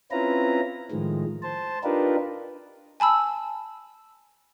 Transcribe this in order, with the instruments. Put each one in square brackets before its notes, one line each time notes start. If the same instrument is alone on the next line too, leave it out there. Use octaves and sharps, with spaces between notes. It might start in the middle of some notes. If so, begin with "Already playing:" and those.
[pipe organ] C4 C#4 E4 F4 B4 A#5
A2 D#3 F3 G#3
C5 A5
D4 D#4 F4 G4 A#4 B4
[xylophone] G#5 A5 B5 E6